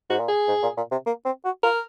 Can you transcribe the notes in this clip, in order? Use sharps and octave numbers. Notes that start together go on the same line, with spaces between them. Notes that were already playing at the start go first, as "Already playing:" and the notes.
G#2 F#4
A#2
G#4
G#2
A#2
A#2
C3
A#3
C4
F#4
F4 A#4